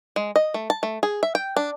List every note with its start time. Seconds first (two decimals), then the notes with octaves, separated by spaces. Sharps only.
0.16 G#3
0.36 D#5
0.54 A3
0.70 A5
0.83 A3
1.03 G#4
1.23 E5
1.35 G5
1.56 D4